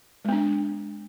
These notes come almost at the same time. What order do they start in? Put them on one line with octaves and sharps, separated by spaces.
G#3 B3 D4